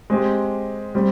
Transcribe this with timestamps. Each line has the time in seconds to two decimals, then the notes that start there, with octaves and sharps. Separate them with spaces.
0.10 G#3 C4 G4
0.95 G3 C4